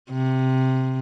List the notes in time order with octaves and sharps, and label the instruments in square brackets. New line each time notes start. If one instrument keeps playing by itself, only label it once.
[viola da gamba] C3